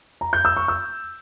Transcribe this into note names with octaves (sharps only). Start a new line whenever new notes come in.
A#5
G6
E6
C#6
E6